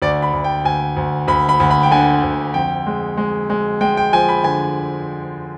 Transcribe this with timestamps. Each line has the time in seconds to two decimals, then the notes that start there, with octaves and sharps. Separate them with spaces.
0.02 D2 D5
0.22 B5
0.33 D2
0.44 G5
0.65 D2 G#5
0.96 D2
1.27 D2 B5
1.49 B5
1.60 D2
1.71 B5
1.83 G5
1.91 D3 G#5
2.23 D2
2.54 F2 G5
2.87 G#3
3.17 G#3
3.50 G#3
3.81 G#3 G5
3.97 G5
4.12 F3 G#5
4.29 B5
4.44 D3 G#5